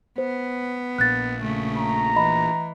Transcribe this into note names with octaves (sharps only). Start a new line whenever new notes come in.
B3 C5
A#1 A#2 F#6 A6
C#3 A3
A#5
E3 D#5 B5